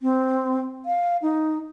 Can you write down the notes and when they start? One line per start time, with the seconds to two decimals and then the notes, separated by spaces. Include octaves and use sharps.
0.02 C4
0.85 F5
1.22 D#4